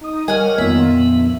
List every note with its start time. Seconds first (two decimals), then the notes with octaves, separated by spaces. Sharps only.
0.01 D#4 D#6
0.28 G3 A#4 C#5 D#5 F#5 G#5 F6
0.58 F2 D#3 A#3 B3 F4 E5
0.86 A#1